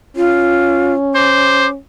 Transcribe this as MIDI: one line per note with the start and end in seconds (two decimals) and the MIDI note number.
0.16 1.78 61
0.16 0.93 65
1.15 1.66 72
1.15 1.68 86